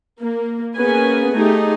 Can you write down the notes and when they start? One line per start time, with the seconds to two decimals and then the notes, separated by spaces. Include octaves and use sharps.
0.20 A#3
0.75 A#3 B3 C#4 G#4 B4 G#5
1.33 A3 D#4 G4 G#4